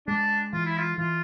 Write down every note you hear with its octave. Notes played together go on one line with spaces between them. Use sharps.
G#3 D4
E3 F4
E4
F4
E3 F4